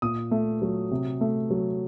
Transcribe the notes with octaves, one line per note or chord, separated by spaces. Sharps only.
A#2 D#6
A3
F#3
C3
A3
F#3